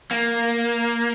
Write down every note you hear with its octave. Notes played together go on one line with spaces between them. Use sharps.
A#3